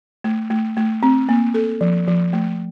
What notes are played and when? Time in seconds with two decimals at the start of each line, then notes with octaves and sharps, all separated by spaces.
0.24 A3
0.50 A3
0.77 A3
1.03 C4
1.29 A#3
1.54 A4
1.81 F3
2.07 F3
2.33 A3